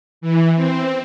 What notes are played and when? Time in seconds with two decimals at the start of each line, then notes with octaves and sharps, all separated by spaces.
0.21 E3
0.56 C4